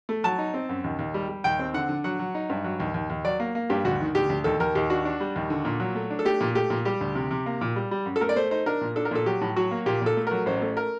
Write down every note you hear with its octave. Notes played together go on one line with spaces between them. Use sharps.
A3
F#3 A5
D#4
C4
F#2
D#2
D#2
G3
G3
D#2 G5
C4
D3 F#5
D3
F#3 F#5
F#3
D#4
G2
F#3
D#2
D#2
D#2
F#3 D5
A#3
A#3
G2 G4
D2 F#4
D#3
D2 G4
D2
D#2 A4
D#2 A#4
D#2 G4
D4 F#4
D4
G3
D#2
D3
A#2
F#3
A3
D4
A4
A3 G4
A#2
A3 G4
A#2
G3 G4
D2
C3
C3
A#3
A#2
G3
G3
F#2
A4
A3 A#4
D5
A3 C5
D#4 C5
D4 A#4
A#2
D4 A4
A#4
A#2 A4
F#3 G4
A2
F#3 F#4
A#3
A#2 G4
A#2 A4
A3
F#3 A#4
A1 C5
A3
A#4